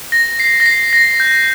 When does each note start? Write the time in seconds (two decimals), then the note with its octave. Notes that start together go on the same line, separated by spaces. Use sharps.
0.12 A#6
0.39 C7
0.60 A#6
0.66 C7
0.93 A#6
1.20 G6